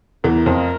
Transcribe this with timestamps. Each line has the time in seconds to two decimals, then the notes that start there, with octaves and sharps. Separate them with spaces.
0.24 E2 A#2 E3 A3 E4 A#4
0.46 F2 F3